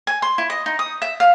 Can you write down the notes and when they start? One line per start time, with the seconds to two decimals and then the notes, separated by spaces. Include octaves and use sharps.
0.07 G#5
0.22 C6
0.38 E4
0.50 D#5
0.66 D#4
0.79 D#6
1.02 E5
1.20 F5